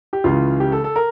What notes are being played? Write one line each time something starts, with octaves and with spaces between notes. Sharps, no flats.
G4
C#2 C#3 E3 F4
G4
A4
A4
A#4